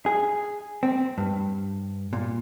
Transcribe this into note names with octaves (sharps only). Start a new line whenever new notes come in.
G#4
C4
G2
A#2